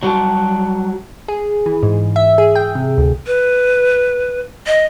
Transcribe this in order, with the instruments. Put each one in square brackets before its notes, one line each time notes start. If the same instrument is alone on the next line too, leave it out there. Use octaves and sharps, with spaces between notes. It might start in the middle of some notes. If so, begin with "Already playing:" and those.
[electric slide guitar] F#3 G3 F#4 D#5 G5 A5
[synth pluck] G#4
E3
G#2
E5
G#4
G5
C3
D2
[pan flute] B4
D#5